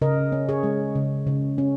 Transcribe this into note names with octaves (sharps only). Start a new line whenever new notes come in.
C#3 A#4 D#5
C#4
G#4 C#5
G#3
C#3
C#3
C#4